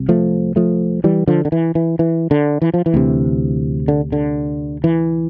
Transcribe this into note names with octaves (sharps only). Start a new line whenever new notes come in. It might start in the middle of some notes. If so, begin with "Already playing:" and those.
Already playing: C2 C3
F3 A3
F3 A3
E3 G3
D3 F3
D3
E3
E3
E3
D3
E3
F3
E3
D2 C3
D3
D3
E3